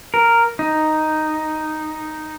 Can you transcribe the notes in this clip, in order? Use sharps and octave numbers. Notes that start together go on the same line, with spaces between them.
A#4
D#4